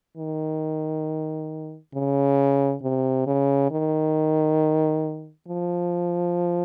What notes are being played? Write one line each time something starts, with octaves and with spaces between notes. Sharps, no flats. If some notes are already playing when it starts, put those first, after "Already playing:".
D#3
C#3
C3
C#3
D#3
F3